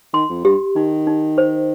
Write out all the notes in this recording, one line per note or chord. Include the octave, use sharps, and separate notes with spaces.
D#3 C6
F2
G2 G4
D#3 D#4
D#4
C5